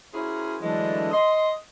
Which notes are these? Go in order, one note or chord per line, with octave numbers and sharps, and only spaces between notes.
C#4 E4 F#4 G#4 A#4 C5
D3 E3 F#3 G#3 A3 D4
D#5 C6